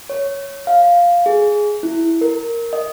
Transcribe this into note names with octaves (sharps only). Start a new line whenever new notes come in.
C#5
F5
G#4
E4
A#4
D#5